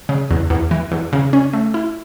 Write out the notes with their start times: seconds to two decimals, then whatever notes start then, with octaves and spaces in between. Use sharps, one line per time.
0.09 C#3
0.31 E2
0.50 E2
0.71 E3
0.92 E2
1.13 C#3
1.33 C#4
1.53 A3
1.74 E4